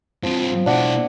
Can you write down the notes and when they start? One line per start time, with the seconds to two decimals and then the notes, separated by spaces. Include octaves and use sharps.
0.23 G2 F3 C4
0.66 B2 D4 E4 F#5